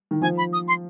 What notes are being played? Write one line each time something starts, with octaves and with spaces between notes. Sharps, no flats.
D#3
F3 G#5
B5
D#6
C6